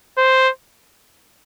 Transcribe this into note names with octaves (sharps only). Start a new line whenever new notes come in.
C5